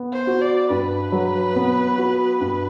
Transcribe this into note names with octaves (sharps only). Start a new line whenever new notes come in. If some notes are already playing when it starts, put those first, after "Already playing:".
Already playing: B3
C5
F#4
D5
G2 B4
F#3
B3
F#4
G2